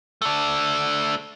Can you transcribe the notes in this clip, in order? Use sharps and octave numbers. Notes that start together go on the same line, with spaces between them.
A3 D4